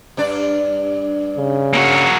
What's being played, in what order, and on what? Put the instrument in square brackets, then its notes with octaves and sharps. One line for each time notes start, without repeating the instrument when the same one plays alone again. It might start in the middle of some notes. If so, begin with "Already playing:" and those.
[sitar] G2 D4 D5
[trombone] C#3
[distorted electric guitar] A#3 F#4